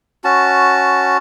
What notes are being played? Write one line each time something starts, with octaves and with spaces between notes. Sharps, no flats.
C#4 F#4 A5